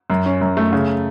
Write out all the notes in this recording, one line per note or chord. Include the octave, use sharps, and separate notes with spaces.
F#2
C#4
F#2
A3
C#3